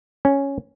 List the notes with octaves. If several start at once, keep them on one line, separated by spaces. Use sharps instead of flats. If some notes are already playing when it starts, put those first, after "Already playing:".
C#4